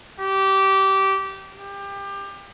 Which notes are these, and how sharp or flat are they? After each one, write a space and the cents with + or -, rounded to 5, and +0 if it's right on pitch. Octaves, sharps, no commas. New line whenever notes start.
G4 -20
G4 +25